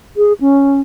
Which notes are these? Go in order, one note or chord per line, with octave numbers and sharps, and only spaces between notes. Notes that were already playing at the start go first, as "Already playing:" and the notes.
G#4
C#4